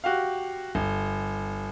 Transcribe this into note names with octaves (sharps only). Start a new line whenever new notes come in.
F#4 G4 F5
G1